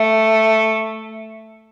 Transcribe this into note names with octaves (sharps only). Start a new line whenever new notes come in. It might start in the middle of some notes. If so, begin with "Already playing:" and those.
Already playing: A3